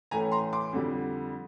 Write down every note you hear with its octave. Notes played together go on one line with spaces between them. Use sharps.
A2 E3 A3 C#4 G#5 A#5
A#5 C6
C6 D6
F2 D3 G3